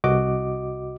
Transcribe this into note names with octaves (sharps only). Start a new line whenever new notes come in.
C2 F#4 D#5 D6